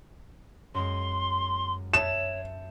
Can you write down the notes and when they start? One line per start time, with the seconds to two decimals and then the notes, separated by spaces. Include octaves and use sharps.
0.74 F#2 G#3 C6
1.93 C#5 E5 A5 E7